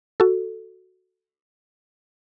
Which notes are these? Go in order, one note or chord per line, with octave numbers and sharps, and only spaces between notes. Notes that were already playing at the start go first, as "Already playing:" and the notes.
F#4 A4